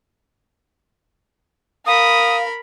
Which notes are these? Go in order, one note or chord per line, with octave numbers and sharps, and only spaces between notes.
A#4 F5 B5 D#6